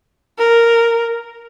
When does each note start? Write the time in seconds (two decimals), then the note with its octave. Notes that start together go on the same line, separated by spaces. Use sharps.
0.38 A#4